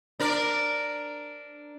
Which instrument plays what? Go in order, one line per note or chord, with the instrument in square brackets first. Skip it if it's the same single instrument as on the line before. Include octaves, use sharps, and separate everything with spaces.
[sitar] D4 A#4 D5